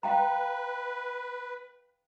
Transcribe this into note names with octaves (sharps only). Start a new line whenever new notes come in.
B4 F5 G5 A#5